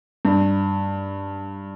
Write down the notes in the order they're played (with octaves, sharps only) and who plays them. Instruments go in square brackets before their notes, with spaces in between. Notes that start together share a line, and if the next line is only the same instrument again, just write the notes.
[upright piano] G2